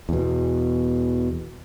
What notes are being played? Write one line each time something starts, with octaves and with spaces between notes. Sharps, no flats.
E2 B2